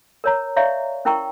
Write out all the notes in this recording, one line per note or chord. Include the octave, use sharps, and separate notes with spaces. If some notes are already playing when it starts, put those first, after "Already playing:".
A#4 C#5 A#5
C#5 D5 E5 F5 A#5 C#6
C#4 E4 A#4 G5 A#5 C#6